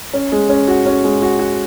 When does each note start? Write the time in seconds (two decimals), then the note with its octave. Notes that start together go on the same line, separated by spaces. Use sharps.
0.14 C#4
0.32 G#3
0.49 C#4
0.68 F#4
0.86 C#4
1.04 G#3
1.22 F#4
1.39 F#4